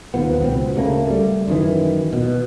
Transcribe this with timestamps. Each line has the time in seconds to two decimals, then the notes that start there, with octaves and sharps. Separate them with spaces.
0.14 D#2 F3 B3
0.41 C#2 B2 C4
0.76 D2 C#3 A3 A#3
1.07 G3 A3
1.48 F#2 D#3 E3
2.13 B2